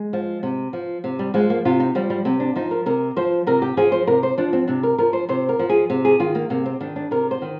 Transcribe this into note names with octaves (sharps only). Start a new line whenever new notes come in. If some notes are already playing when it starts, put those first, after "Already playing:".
Already playing: G#3
F3
C3
F3
C3
G3
F3 G#3
A#3
C3 F4
D#4
F3 G3
G3
C3 C4
D4
F3 D#4
A#4
C3 A#4
F3 C5
C3 A#4
G4
F3 G#4
C5
C3 A#4
C5
F3 D4
C4
C3 D4
A#4
F3 A#4
C5
C3 C5
A#4
F3
G#4
C3
G#4
D#3 F4
A#3
C3 A#3
C4
D#3 D4
D4
C3 A#4
C5
D#3